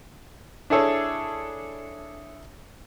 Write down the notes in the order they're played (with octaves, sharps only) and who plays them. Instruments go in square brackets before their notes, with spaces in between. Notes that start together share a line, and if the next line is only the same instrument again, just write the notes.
[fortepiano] D4 E4 G#4 A4 C#5